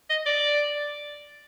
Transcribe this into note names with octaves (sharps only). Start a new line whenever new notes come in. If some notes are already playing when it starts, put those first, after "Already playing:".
D#5
D5